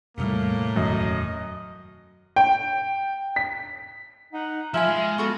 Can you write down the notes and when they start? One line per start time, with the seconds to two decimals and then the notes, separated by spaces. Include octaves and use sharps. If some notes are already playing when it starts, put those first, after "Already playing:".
0.17 E2 A2 C3 G3 A#3
0.76 E1 B1 F#2 D#3 D#5
2.36 G5
3.36 B6
4.33 D#4 F#5
4.74 F3 F4 E5 G#5 B5 F6
4.88 G#3 C6
5.18 B3 F#4 A4 C#6